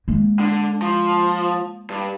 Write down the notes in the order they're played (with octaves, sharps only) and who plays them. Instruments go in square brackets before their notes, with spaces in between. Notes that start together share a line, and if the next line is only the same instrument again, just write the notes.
[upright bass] G#3 A#3
[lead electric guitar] D3
F3
G2